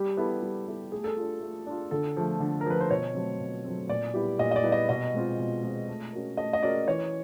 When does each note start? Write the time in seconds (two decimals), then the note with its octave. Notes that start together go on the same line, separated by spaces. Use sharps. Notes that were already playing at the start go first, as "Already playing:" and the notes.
Already playing: G3 G4
0.17 B3 E4 A4
0.42 G3
0.67 B3 E4 A4
0.92 A3 G#4
1.04 A4
1.17 D4 F4
1.41 A3
1.66 D4 F4
1.91 D3 A4
2.17 F3 A3
2.40 D3
2.61 A#4
2.66 F3 A3 B4
2.80 C5
2.90 B2 C#5
3.15 F#3 A3 C4
3.40 B2
3.65 F#3 A3 C4
3.89 A#2 D5
4.14 G3 B3 E4 G4
4.39 A#2 D#5
4.51 D#5
4.56 D5
4.63 G3 B3 E4 G4
4.72 D#5
4.89 B2 D#5
5.14 G#3 C4 F4
5.39 B2
5.63 G#3 C4 F4
5.88 A3
6.13 C#4 F#4 A#4
6.37 A3 D#5
6.53 D#5
6.63 C#4 F#4 A#4 D5
6.87 E3 C#5